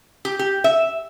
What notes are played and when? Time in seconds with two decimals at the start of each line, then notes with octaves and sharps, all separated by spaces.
0.25 G4
0.39 G4
0.64 E5